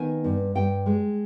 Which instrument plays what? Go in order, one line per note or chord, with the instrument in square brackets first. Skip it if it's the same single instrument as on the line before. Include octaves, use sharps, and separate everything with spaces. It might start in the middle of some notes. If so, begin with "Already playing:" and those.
Already playing: [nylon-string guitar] D#3 B3 G#5
G2
G2 G5
G#3